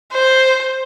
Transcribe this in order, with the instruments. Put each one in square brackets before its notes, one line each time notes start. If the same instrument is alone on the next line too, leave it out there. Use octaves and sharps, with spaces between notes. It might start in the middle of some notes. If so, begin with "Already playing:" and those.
[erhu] C5